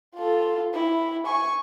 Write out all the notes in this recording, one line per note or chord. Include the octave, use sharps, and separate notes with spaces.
F4 A4
E4
G#5 C#6